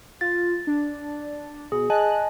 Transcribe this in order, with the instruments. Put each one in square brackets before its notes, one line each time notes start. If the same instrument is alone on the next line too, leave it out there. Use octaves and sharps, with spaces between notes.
[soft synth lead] F4 [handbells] A6
[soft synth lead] D4
[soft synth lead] B2 [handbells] G#4
[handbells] D#5 G#5 A5 [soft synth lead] F#6